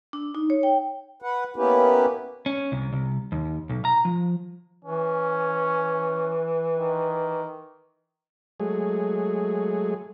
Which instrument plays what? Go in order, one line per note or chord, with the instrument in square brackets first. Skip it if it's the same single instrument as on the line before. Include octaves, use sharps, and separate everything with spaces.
[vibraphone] D4
D#4
C#5
G5
[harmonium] B4 F#5
A#3 B3 C#4 E4 G4 B4
[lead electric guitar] C#4
C2
C2
D#2
B1
A#5
F3
[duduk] E3 [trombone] C#4
[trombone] D#3
[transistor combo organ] F#3 G#3 A3 G#4